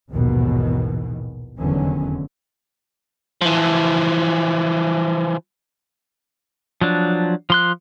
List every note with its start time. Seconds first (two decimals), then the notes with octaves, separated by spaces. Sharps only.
0.10 A#1 D#2 G#2 B2 D#3 E3
1.57 F1 E2 D3 D#3 F#3 C#4
3.42 E3 F3
6.81 F3 F#3 D4
7.50 F3 C6 F#6